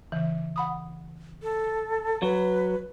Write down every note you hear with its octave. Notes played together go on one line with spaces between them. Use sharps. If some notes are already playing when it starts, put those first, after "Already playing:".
C#3 E3
F#5 B5 D#6
A4
F#3 B4